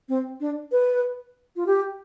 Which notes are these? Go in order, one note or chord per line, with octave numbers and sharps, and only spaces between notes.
C4
D4
B4
F4
G4